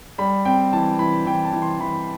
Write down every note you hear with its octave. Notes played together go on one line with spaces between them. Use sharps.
G3 B5
C4 G5
E3 A5
E3 B5
E3 G5
A5
E3
C6
E3 B5